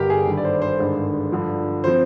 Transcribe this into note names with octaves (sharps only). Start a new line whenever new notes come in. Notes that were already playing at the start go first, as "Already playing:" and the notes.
Already playing: G1 G2 D3 G4 A#4
G#4
G#1 G2 D3 G3
D5
C5
C5
G#1 G2 D3 G#3
G2 D3 F3
F3 C4 C5